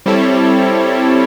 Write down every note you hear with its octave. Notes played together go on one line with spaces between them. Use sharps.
G3 C4 E4 A4 C#5